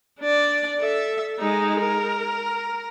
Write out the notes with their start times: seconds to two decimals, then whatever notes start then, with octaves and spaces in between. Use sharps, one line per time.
0.20 D4 D5
0.80 A4 E5
1.39 G#3 D#4
1.81 A#4